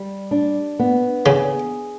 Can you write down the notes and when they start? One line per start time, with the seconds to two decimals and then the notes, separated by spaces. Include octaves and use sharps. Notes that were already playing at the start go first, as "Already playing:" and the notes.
Already playing: G3
0.31 D4
0.79 B3
1.26 C#3 G#4